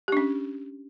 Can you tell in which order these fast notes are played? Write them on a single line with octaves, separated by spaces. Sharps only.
G4 D4 C#4